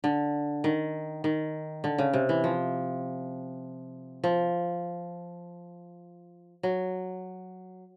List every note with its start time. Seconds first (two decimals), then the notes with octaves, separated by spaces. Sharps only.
0.04 D3
0.64 D#3
1.24 D#3
1.84 D3
1.98 C#3
2.13 C3
2.29 E3
2.44 F3
4.24 F3
6.63 F#3